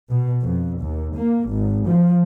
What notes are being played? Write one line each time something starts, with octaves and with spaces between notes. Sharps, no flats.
B2
F2
D#2
A#3
G#1
F3